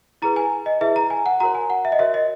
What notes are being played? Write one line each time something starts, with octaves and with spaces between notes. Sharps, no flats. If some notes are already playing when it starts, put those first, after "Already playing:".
E4 G#4 B4 A#5
G#5
D#5
E4 G#4 B4 E5
A#5
G#5
F#5
F#4 A#4 C#5 A#5
G#5
F#5
E5
D#5
F#4 A#4 C#5 E5
D#5